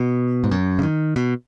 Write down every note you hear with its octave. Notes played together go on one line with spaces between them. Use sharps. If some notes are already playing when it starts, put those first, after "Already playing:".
Already playing: B2
G#2
F#2
C#3
D#3
B2